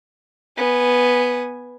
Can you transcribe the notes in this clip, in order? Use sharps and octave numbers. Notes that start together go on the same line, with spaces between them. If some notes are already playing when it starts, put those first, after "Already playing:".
B3 G#5